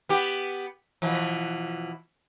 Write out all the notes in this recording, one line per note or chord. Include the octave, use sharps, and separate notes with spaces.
B3 G4
B2 E3 F3